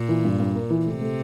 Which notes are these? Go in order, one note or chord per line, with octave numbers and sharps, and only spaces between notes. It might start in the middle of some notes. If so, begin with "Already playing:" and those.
Already playing: A#2
E3
G2
G2
A#3
E3
C3 A3
A3